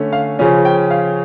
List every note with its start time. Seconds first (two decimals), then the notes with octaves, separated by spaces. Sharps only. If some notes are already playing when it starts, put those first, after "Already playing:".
Already playing: D3 A3 C#4
0.13 F5
0.39 C#3 F3 C#4
0.65 G5
0.91 F5